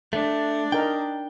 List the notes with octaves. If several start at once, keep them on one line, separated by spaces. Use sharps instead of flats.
A3 D4
D#4 A#4 G5